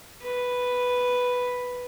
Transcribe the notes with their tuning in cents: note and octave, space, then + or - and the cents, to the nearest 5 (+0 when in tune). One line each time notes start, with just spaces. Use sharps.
B4 +0